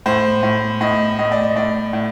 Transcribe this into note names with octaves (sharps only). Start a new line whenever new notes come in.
A2 C5
A2
A2 D#5
A2 D#5
D5
D#5
A2 D5
A2